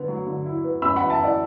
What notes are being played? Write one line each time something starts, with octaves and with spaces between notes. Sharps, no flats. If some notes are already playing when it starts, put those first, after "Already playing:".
Already playing: D3 B3
F#3
D3
E4
B3
F#2 B5 E6
E3 F#5 B5
E5 A5
E4 D5 F#5